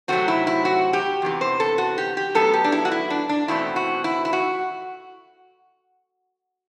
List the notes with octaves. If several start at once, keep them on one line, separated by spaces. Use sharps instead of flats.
C3 F#3 A3 C4 F#4
E4
E4
F#4
G4
E2 C3 E3
C5
A4
F#4
G4
G4
A2 F#3 B3 A4
G4
D4
E4
F#4
E4
D4
D4
E2 B2 A3 C4 E4
F#4
E4
E4
F#4